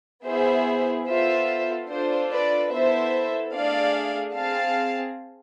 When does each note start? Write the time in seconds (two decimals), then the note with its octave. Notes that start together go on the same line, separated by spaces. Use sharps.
0.25 B3 E4 G#4 C5 E5
1.07 B3 F4 A4 C5 E5
1.90 D4 F4 A4 C5
2.31 B4 D5
2.71 B3 E4 A4 C5 E5
3.53 A3 D4 G#4 D5 F5
4.35 C4 G#4 F5 A5